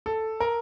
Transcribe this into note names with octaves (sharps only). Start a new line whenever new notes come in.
A4
A#4